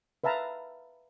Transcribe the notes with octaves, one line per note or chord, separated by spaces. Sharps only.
B4 E5 F5 A5 A#5